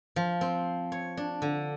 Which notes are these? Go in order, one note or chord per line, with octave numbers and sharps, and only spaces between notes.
F3
C4
C#5
D4
D3